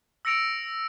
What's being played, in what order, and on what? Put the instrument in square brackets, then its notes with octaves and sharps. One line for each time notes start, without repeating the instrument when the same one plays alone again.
[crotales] E6 A#6 C#7 D7 F7